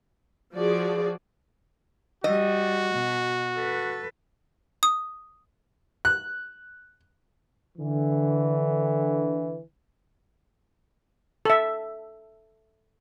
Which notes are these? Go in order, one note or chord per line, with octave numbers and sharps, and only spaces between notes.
F3 F#4 G#4 D5
G3 F#4 D#5
B2
A4 B4
D#6
F#6
D3 E3
A4 E5